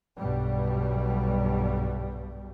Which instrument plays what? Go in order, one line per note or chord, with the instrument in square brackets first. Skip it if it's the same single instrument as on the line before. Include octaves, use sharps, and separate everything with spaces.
[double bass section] B1 G2 B2 G3